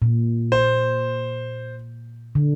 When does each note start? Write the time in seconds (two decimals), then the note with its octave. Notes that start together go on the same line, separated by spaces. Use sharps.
0.02 A#2
0.52 C5
2.35 D3